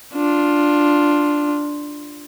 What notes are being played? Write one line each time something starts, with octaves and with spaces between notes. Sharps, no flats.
D4 F4